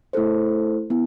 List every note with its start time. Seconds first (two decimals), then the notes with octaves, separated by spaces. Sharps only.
0.13 A3 E4 A4 C5
0.90 B3 E4